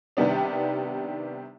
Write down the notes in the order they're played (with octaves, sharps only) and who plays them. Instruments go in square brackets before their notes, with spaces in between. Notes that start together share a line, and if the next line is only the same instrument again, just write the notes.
[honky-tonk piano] C3 D#3 G3 B3 D4